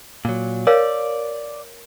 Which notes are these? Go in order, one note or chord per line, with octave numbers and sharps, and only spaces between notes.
A#2 F#3
A#4 C#5 D5 F5